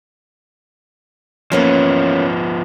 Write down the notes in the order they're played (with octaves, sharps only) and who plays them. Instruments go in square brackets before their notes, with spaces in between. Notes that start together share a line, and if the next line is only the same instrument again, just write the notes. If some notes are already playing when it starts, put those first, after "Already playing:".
[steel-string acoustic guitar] E3 A#3 C#4 [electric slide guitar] F3 B3